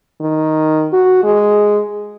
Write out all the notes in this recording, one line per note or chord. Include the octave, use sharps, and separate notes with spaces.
D#3
F#4
G#3